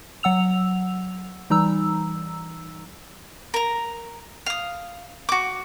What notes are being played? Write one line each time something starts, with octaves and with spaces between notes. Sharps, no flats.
F#3 F#5 E6 F7
E3 G3 D#4 A#5 E6
A#4 A#5
F5 D#6
F#4 D6